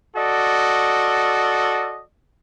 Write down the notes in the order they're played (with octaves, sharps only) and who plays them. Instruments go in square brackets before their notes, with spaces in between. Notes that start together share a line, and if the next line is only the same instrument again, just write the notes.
[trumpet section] F#4 A4 D5 D#5